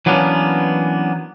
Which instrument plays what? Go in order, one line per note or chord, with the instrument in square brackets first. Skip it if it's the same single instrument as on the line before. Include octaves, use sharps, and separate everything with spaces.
[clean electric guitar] E3 F#3 A#3 B3 C#4 D4